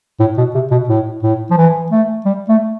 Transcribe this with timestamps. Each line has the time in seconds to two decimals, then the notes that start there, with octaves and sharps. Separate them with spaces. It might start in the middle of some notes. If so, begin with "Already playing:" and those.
0.20 A2
0.38 B2
0.55 C3
0.71 B2
0.89 A2
1.23 A2
1.51 F3
1.57 E3
1.92 A3
2.26 G3
2.49 A3